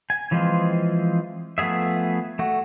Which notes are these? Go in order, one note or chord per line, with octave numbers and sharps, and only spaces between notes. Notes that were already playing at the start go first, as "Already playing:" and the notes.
G#5
E3 F3 G#3 C4 F4
F3 A3 B3 G#4 E5
A3 F#4